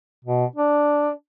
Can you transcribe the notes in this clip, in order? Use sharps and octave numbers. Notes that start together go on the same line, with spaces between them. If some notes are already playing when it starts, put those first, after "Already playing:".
B2
D4